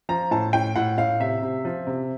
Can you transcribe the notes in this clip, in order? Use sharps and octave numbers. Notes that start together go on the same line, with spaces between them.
F3 A#5
A2 A5
A2 G5
A2 F#5
A2 F5
C3 E5
C3
F3
C3